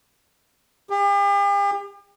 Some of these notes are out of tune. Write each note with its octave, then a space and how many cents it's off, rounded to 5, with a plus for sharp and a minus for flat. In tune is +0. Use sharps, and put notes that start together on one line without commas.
G4 +45